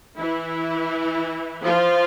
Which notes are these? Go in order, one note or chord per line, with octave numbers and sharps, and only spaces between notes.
E3 E4
F3 F4